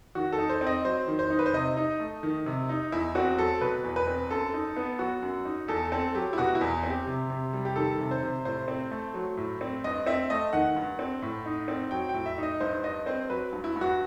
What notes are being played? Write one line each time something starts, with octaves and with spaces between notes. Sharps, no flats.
D#3 F#4
A4
D#4
C5
C4
D#5
F#3 C5
D#3
C5
D#4
B4
C5
C3 D#5
D#4
A3
D#3
C3
D#4
E2 E4
C4 F#4
F#3 A4
B2 B4
E2
B4
C4
F#2 A4
D#4
B3
F#3 F#4
F#2
D#4
E2 A4
C4 A4
F#3 G4
E4
B2 F#4
E4
E2
C4
G4
C3
C3
G3
G4
D#3 A4
C3
C5
C3
A2 C5
C4
A3
F#3
A2
C4
G2 D#5
C4 E5
A3 D#5
D#3 F#5
G2
C4
A2
D#4
C4
F#3 G5
G5
A2
E5
D#4
D#5
G2 C5
G2 D#5
C4 C5
F#3 B4
G2
E4
G2
F#4